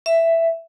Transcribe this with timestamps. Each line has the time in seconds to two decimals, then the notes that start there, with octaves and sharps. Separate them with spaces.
0.06 E5